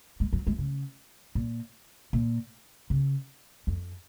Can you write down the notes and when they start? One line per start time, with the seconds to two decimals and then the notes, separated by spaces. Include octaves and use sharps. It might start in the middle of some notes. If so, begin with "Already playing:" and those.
0.20 G#3
0.33 F#3
0.47 G#3
0.58 C#3
1.35 A#2
2.13 A#2
2.90 C#3
3.67 F2